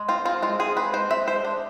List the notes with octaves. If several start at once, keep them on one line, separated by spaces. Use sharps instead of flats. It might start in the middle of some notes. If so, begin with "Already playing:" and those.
Already playing: G#3
C4 F4
C4 F4
G#3 F4
C4 G#4
C4 B4
G#3 C5
C4 E5
G#3 C5
D4